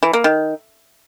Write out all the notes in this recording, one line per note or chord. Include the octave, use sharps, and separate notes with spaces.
E3
A#3
D#3